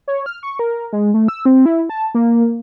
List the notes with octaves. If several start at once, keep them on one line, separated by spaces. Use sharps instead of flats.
C#5
F6
C#6
A#4
G#3
A3
E6
C4
E4
A5
A#3